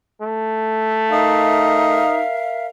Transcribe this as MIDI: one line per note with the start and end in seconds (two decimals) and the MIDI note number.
0.21 2.04 57
1.11 2.22 63
1.11 2.67 70
1.11 2.67 76
1.11 2.67 77